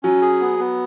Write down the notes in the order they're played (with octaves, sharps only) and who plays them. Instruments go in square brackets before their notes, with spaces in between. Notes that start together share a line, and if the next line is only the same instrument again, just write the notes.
[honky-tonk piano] F#3 [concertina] C#4
[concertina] G#4
B3
B3